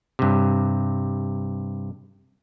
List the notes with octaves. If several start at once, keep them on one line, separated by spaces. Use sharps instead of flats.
G2 C3